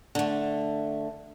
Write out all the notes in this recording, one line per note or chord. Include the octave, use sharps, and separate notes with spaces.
D3 A3